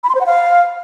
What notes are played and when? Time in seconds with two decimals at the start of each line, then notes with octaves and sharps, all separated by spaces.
0.04 B5
0.09 C6
0.15 C5
0.21 F#5
0.26 F5